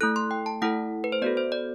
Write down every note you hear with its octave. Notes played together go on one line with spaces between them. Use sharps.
A3 E4 A4 F#6
C6
G5
A5
A3 E4 A4 F#5
B4
C5
B3 F#4 A4 D5
C5
D5